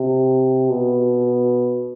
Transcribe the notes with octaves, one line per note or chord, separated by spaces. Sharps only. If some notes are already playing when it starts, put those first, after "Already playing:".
Already playing: C3
B2